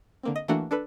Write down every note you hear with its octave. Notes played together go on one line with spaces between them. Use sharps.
D3 A#3 C4
D#5
E3 A3 A#3 D4 F#4 F#5
D4 A4 B4